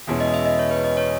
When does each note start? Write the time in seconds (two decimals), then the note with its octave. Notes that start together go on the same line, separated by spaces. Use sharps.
0.07 E2 B2 G#3 C#4 E4
0.20 D#5
0.34 E5
0.45 D#5
0.59 C#5
0.71 B4
0.84 D#5
0.97 C#5